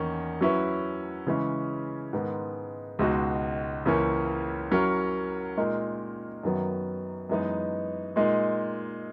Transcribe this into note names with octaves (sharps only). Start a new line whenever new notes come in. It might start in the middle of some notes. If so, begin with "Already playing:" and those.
Already playing: E2 D#3 A#3 C#4
F#3 C#4 E4 B4
C#3 E3 G#3 C#4
G#2 D#3 G#3 B3
C#2 B2 G#3 D#4 F#4
C#2 C#3 E3 A#3 C#4
F#3 C#4 E4 A#4
A#2 G#3 D#4 A#4
F#2 D#3 F#3 B3
F#2 E3 G#3 B3 D#4
A#2 G#3 D#4